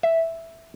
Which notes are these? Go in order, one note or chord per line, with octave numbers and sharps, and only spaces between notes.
E5